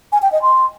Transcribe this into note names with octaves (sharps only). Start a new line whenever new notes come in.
G#5
G5
D#5
C6